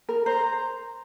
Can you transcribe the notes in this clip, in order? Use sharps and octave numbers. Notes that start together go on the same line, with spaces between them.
A#4
C5 A#5